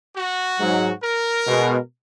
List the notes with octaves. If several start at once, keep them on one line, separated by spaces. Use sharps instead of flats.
F#4
G#2 F#3
A#4
B2 G#3